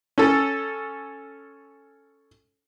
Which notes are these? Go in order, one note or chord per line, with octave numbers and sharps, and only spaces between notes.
C#4 A4